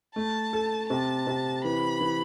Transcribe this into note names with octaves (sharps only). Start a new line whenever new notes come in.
A3 A5
A4
C3 A5
C3
E3 B5
E3